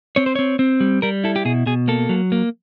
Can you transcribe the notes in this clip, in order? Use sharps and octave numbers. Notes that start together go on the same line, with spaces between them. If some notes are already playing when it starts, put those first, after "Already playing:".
C4 C#5
C5
C4 C#5
C4
G3
G3 A#4
E4 A4
G4
B2 G#4
B2 G#4
A#3 A4
F#3
A#3